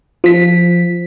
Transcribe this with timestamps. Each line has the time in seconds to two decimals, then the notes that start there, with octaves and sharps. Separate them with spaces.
0.24 F3 B6